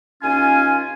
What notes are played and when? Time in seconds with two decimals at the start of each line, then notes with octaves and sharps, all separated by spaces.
0.23 D#2 C#4 F4 G#5